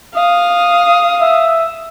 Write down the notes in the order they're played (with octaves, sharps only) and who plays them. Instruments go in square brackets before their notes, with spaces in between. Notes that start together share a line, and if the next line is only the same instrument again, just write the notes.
[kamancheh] F5 [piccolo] D#6
[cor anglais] E5